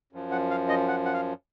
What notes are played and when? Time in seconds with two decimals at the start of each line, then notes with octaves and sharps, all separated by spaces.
0.13 F#2 F3
0.31 F#5
0.51 F5
0.69 D#5
0.88 F#5
1.05 F#5
1.14 F5